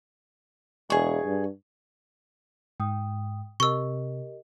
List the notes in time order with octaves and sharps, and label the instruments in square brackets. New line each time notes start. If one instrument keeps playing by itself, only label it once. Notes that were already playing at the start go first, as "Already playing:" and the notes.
[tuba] E1 [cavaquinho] G#4 C#6
[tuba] G2
[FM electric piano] G#2 [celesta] G5 D#6
[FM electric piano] C3 [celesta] G4 A#4 D#5 [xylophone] C#6 E6